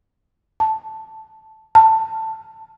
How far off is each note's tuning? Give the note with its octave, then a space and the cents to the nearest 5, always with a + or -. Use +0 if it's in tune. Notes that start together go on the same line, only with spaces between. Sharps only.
A5 +0
A5 +15